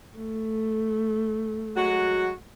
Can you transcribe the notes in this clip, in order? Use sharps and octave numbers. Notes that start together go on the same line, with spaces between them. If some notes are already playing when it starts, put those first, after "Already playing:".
A3
F#3 G#3 F#4